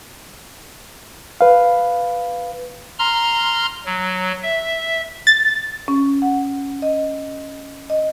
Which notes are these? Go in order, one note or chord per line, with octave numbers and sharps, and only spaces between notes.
B4 F5
A#5 C6 F6
F#3
E5
A6
C#4
F#5
D#5
D#5